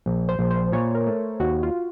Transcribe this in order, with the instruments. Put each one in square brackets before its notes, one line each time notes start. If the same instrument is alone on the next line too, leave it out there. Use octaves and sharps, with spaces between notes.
[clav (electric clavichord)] A#1
[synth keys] C5
[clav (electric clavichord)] A#1
[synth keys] C5
[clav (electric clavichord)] A#2 [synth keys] C#5
[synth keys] A#4
[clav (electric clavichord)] A3
[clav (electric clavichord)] D#2 [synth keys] F#4
[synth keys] F4